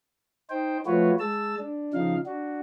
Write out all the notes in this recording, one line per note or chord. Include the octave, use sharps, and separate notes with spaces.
D#4 C5 G5
F3 A3 F4 F#4 B4 C#5
G#3 A5 E6
D4
C#3 F3 D#4 F5
D4 F#4